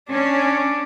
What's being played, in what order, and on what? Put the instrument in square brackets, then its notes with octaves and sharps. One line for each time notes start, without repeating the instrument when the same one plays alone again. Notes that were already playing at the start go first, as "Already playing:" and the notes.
[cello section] C#4 [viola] D4